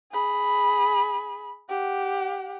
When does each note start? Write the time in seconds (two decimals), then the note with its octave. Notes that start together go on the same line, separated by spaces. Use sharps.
0.12 G#4 B5
1.69 G4 F#5